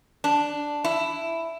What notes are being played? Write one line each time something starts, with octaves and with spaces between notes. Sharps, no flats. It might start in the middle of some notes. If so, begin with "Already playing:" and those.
D4
E4